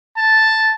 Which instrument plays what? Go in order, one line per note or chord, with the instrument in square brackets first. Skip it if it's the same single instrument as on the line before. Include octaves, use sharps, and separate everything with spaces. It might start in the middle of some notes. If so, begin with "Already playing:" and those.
[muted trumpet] A5